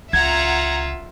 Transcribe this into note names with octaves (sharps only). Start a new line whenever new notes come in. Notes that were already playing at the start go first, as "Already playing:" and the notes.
C#2 F4 E5 F#5 A#5 G#6